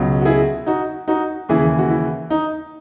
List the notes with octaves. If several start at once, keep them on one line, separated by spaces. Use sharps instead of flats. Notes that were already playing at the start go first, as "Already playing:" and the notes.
Already playing: C#2 B2 F#3
F#4
E4 G#4
D#4 F#4
D#4 F#4
D#2 C#3 E3 E4 G#4
F#4
E4
D#4